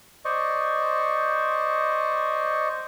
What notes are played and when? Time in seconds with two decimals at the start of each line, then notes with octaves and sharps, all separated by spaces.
0.25 C5 D5 D#5 C#6